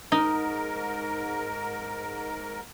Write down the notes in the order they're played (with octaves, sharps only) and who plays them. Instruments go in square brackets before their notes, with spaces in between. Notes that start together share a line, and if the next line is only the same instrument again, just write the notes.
[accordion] G#2 A#4 [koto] D#4